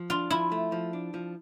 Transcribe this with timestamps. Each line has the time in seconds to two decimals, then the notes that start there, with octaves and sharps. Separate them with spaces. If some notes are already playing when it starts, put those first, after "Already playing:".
Already playing: F3
0.10 D4 F4
0.30 F3 E4
0.52 A3
0.72 F3
0.93 D4
1.14 F3